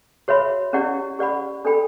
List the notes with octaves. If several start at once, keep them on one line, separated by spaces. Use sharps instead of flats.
F#4 C#5 E5 B5
C#4 E4 G4 D5 F#5
G4 D5 F#5 B5
D4 A4 D5 G5 B5